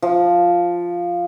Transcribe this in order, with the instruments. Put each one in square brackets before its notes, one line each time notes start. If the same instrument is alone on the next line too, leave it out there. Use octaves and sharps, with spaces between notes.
[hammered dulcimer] F3